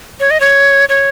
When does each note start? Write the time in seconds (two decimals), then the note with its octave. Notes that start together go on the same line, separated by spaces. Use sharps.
0.20 C#5
0.31 D#5
0.40 C#5
0.89 C#5